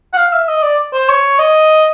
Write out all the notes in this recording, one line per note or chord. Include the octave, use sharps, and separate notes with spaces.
F#5
F5
E5
D#5
D5
C5
C#5
D#5